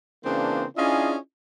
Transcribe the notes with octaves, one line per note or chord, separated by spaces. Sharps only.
C#3 E3 A#3 C4 D4
C#4 D4 E4 F4 G#4 D#5